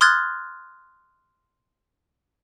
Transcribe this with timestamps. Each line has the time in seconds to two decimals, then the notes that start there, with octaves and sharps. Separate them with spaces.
0.01 C6 D#6 F6 F#6 G#6 A6